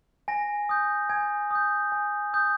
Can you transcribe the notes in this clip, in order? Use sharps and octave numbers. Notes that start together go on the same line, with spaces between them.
G#5 A#6
D#6 G6
G#5 G#6
D#6 G6
G#5
D#6 G6